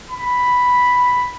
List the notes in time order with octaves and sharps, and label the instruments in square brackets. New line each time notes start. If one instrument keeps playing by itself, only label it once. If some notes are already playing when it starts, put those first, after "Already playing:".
[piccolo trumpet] B5